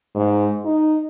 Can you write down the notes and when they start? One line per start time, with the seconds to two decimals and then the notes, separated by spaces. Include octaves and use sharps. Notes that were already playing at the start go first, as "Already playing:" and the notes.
0.15 G#2
0.65 D#4